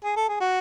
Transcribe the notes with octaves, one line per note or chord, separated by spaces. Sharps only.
G#4
A4
G#4
F#4